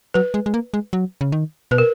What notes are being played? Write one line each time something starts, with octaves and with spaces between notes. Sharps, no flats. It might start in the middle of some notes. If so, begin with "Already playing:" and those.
F#3 B4
G#3
G#3
A#3
G#3
F#3
C#3
D#3
B2 B4
A#4